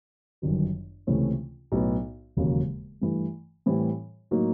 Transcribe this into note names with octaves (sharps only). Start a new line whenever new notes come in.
G1 F#2 D#3 F#3
C#2 C3 E3 A3 C#4
B1 A2 F#3 B3
E1 D#2 C#3 F#3 A#3
G2 E3 A3
A2 E3 G3 C4
A2 F#3 A#3 D#4